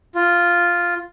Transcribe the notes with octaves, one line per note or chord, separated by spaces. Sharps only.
F4